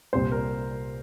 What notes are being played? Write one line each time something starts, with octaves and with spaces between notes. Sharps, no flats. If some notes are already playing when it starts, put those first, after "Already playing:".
C2 A#2 G3 C4 C5
A#4